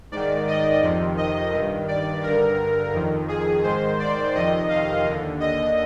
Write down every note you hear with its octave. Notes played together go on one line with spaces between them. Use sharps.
G#2 D#3 D5
D#5
F2 C3 D#3
D#5
G2 D#3
D5
G2 D3 A#4
F2 D#3
G#4
G#2 D#3 C5
D5
F2 C3 D#3 D#5
F5
D#2 D3
D#5